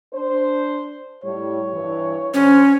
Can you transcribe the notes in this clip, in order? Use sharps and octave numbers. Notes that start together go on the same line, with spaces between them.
D4 C5
A2 G3 C#5
G2 E3
D3 G3 C#4 C5